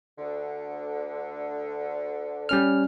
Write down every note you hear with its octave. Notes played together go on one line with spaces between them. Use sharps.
D2 D3
G3 C#4 F6